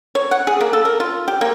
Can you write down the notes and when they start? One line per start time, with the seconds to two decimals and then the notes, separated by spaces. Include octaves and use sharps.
0.15 C#5
0.31 F#5
0.47 G#4
0.61 A#3
0.73 A4
0.85 A#4
1.00 F4
1.28 G4
1.41 A#3